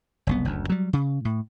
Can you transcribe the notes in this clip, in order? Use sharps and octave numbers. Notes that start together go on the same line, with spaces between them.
F#1 C2 B3
F#1 D2
F#3 G3
C#3
A2